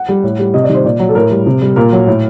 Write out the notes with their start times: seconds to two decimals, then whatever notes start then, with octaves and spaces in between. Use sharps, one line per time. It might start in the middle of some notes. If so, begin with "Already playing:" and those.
Already playing: F#5
0.09 G3
0.23 A2
0.39 G3
0.54 C3 D#5
0.64 D5
0.69 D#3 G3
0.74 C5
0.85 A#2 D5
0.99 F#3
1.09 A4
1.15 A2 A#4
1.31 G3
1.46 C3
1.61 G3
1.76 A#2 A#4
1.92 F#3
2.07 A2